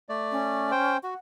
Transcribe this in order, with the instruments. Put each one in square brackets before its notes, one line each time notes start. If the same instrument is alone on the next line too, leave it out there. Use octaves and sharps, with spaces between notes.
[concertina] A3 D5
[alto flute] C#4
[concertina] C5 G5
[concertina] F#4 [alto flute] F#5